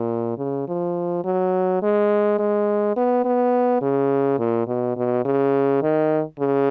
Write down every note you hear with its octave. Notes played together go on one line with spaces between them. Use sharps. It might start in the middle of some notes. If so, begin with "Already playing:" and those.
Already playing: A#2
C#3
F3
F#3
G#3
G#3
B3
B3
C#3
A#2
B2
B2
C#3
D#3
C#3